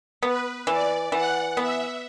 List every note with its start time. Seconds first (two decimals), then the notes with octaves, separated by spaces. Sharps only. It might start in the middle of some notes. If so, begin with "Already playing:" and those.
0.22 B3 B4
0.67 E3 D5
1.12 E3 F#5
1.57 B3 E5